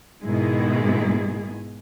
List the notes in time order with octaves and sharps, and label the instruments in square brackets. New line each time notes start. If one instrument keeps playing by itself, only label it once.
[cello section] G#2 B2 D#3 G#3 E4 G#4